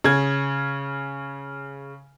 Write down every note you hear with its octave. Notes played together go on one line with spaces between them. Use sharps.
C#3 G#6